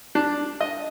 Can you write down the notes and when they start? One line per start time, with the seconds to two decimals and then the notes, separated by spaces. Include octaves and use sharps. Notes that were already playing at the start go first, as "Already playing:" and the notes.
0.15 D4
0.61 D#5